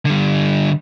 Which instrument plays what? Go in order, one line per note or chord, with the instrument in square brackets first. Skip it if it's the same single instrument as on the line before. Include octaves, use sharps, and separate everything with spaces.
[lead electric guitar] D3 G3